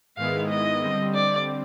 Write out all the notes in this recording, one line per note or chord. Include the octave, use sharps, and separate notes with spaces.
G#2 D#3 G#3 B3 E4 F5
D#5
D3 G3 C4
D5